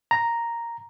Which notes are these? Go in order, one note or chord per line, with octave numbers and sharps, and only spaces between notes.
A#5